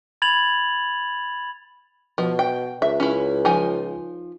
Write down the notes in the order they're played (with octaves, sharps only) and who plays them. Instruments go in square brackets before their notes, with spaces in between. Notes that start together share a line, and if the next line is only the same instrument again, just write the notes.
[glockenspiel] B5 G#6 A6 F7 F#7
[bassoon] B2 [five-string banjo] F3
[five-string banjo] G5
[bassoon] C#2 [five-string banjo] E5
[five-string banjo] C#4 E4
F3 D#4 G#5